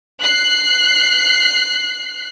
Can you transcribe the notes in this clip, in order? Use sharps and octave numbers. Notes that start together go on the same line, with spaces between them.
F#6 C7